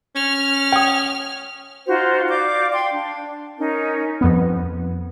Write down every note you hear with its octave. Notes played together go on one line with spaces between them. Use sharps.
C#4 F6
G5 D#6
D#4 F4 F#4 C5
D5 F5 D6 G6
G5 C6 G#6
D4
C#4 D#4 A#4
F2 B3